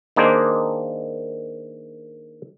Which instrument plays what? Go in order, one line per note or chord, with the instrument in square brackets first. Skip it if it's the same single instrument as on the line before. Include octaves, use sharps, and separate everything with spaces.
[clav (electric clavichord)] D#3 A#3 D4 G#4 C5 D#5